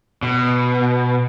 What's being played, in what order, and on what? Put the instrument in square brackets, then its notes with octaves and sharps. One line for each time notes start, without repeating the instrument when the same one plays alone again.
[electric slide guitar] B2